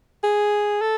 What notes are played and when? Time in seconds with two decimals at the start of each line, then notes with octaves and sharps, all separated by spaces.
0.24 G#4
0.82 A4